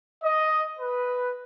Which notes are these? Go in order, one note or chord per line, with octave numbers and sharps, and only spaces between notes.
D#5
B4